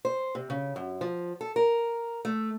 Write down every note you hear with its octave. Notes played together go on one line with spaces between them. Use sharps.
C5
C3
C#3
F#2
F3
A4
A#4
A3